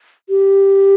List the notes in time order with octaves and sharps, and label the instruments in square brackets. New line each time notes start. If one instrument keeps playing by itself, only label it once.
[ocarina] G4